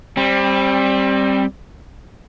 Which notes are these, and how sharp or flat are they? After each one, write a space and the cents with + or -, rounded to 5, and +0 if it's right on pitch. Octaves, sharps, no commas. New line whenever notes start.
G3 +5 C4 +25